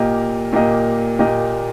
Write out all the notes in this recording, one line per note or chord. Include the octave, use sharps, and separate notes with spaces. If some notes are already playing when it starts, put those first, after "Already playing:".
Already playing: A#2 A#3 G4 A#4 D#5
A#2 A#3 G4 A#4 D#5
A#2 A#3 G4 A#4 D#5